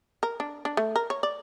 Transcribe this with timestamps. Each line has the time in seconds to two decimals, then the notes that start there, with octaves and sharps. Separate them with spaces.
0.23 A#4
0.40 D4
0.65 D4
0.77 A3
0.96 A#4
1.10 C#5
1.23 D5